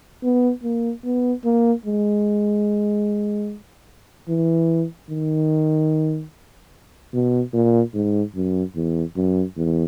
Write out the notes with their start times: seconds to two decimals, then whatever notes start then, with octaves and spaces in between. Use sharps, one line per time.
0.24 B3
0.63 A#3
1.05 B3
1.44 A#3
1.86 G#3
4.29 E3
5.10 D#3
7.14 B2
7.53 A#2
7.94 G#2
8.35 F#2
8.75 E2
9.16 F#2
9.57 E2